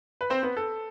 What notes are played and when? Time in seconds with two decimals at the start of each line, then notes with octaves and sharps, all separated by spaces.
0.21 B4
0.30 C4 C5
0.43 B3 B4
0.57 A4